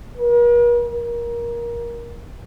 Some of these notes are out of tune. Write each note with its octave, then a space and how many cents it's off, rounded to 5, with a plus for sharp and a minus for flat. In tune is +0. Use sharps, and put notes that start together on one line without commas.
A#4 +45
A#4 +20